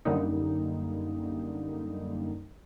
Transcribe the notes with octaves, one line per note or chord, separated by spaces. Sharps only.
F#2 D3 G3 A#3 D#4